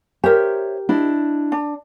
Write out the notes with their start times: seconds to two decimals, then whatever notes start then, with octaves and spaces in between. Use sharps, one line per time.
0.24 G4 A#4 C5 C#5 E5
0.89 D4 E4 D#5
1.52 D4